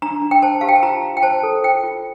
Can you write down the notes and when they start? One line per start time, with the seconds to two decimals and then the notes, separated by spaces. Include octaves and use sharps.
0.02 D4 A#5
0.22 D4
0.31 G5
0.42 C5 A5
0.61 G4 F5
0.69 G5
0.75 A5
0.83 F4 A#5
1.03 F4
1.17 G5
1.23 C5 A5
1.43 A4
1.63 F4 G5
1.83 F4